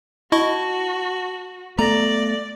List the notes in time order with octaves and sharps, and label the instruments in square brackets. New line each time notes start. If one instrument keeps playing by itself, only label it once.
[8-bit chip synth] E4 D#5 C#6 [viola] F#4 [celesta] A5
[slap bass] A3 B3 [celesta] A4 A#6 [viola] D5 [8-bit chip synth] A#5